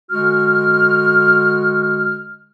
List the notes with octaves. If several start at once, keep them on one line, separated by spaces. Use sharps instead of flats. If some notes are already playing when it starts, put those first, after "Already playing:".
D3 G#3 F#4 F6